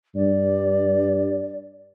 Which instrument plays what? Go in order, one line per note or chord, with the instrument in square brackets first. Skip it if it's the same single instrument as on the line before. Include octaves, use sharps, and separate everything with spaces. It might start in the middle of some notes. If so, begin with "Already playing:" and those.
[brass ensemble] G2 [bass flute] D5